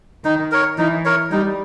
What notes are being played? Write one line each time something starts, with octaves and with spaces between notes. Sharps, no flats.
D#3 D#4
A#4 C#5
E3 D#4
A#4 C#5
G3 D#4